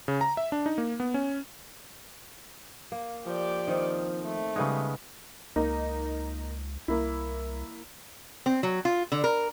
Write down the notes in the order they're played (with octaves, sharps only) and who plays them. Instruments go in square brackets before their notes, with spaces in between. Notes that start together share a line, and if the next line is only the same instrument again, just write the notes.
[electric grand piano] C#3
A#5
E5
D4
D#4
A#3
B3
C#4
[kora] A#3
[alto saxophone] F3 [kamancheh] G4 D5
[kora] D#3 C4 D#4
[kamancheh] A3
[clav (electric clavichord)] C#3 G#3 [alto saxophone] G3 [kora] B3 D#4
[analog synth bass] C#2 [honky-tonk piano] A#3 D#4
[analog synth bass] C2 [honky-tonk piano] A#3 E4
[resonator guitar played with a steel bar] C4
F#3
F4
D3
A#4